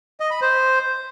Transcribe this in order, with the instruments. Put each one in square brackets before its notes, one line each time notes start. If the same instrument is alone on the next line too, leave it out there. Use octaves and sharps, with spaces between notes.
[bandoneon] D#5
B5
C5